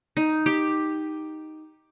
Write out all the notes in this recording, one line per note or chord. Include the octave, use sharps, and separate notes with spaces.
D#4
G4